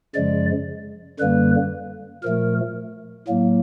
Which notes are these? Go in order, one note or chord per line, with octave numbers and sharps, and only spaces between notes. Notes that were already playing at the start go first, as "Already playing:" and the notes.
F#2 C#3 F3 G#3 D5
F#2 D3 G3 A#3 B4
A#2 F3 A3 A#4
A2 F#3 A#3